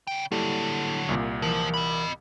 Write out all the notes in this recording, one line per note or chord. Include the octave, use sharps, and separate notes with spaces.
C#3 G5
D3 F#3 G3 A#3 E4 A4
C2 A#2
E3 F3 A#4
D#5 B5